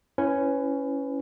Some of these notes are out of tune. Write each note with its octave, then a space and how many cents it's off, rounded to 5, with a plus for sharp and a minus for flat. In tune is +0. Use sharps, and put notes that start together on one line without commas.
C#4 +0 E4 +0 B4 +25